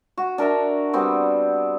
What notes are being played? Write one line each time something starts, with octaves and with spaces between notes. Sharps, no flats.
F#4
D4 A#4 E5 A5
G3 B3 C4 F#4